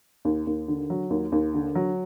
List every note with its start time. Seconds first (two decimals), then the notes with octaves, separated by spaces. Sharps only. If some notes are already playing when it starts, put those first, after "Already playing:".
0.25 D#2
0.47 D#2
0.68 D3
0.90 F#3
1.10 D#2
1.32 D#2
1.54 D3
1.75 F#3